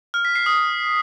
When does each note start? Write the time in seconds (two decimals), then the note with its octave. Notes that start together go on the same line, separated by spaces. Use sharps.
0.14 F6
0.25 B6
0.35 C7
0.46 D#6